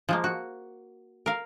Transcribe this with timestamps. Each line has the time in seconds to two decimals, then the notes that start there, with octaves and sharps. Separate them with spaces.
0.09 F3 G#3 A#3
0.24 F#4
1.26 A#4 F5